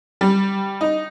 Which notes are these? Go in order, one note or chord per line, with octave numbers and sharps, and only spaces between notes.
G3
D#4